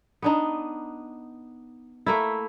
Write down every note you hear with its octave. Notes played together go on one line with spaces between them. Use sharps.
B3 D4 D#4
A3 A#3 E4